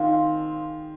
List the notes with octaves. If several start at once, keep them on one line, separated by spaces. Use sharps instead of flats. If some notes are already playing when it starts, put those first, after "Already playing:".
Already playing: A#2 D#3 G#3 C4 F4